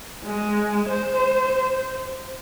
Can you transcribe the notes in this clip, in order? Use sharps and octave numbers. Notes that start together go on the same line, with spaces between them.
G#3
C5